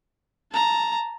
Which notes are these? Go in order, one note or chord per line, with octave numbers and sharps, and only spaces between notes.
A5 A#5